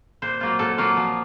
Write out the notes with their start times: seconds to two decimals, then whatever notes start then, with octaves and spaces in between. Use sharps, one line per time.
0.22 A#2 C5
0.41 F#3 A#3 F4
0.59 A#2 A4
0.78 F#3 A#3 F4
0.97 F3